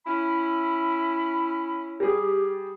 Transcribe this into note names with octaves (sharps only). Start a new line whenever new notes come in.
C#4 E4 B5
G3 G4 G#4